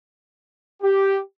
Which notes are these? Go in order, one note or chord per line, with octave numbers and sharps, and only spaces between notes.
G4